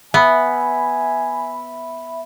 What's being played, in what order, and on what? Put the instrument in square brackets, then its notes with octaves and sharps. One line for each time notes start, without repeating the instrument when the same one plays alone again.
[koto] B3 [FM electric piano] E5 B5 [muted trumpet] G#5